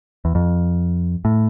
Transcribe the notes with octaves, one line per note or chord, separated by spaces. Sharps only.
E2
F2
A2